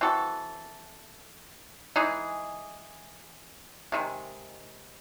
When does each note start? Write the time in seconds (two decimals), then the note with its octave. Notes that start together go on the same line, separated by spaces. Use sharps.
0.01 E3 C4 F#4 A4
1.96 E3 G#3 D#4 G#4
3.92 C3 D#3 G#3